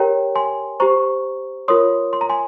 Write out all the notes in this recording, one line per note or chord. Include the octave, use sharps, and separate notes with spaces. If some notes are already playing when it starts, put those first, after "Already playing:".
Already playing: G4 A#4 C#5 G5 A#5
G#5 C6
G4 C5 A#5 C#6
F4 A#4 C#5 C6 D#6
C6
A#5
G#5 C6